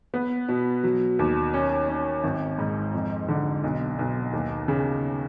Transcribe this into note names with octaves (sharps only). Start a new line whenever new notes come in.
B3
B2
F#3
D#2
C#4
C#4
G#1
G#2
F2
D3
B1
B1
D#2
C#3